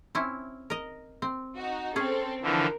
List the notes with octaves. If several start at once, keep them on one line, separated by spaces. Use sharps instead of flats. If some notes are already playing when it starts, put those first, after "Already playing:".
C4 C#4 E4
A#4 D#5
C4
D#4 F#4
C4 C#4 G#4 A4
D3 E3 F3 A#4